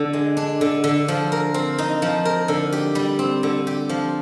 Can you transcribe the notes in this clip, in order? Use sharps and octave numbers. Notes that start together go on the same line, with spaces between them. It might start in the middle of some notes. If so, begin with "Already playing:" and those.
Already playing: D3
G#3
D4
D3
D3
F3
A#4
C4
D#4
F3
A#4
D3
G4
G3
C4
D3
G4
F3